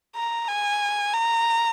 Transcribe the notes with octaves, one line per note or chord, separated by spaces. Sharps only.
A#5
G#5
A#5